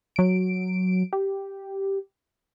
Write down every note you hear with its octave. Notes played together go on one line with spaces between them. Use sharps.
F#3 D7
G4